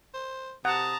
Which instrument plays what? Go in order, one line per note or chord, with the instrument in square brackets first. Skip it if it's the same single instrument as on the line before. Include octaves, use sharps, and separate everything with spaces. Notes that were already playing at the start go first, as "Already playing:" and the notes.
[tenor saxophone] C5
[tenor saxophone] C3 [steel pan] F#5 [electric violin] A5 A#5 [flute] D#6